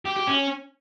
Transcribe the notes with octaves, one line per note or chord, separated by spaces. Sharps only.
G4
G4
C#4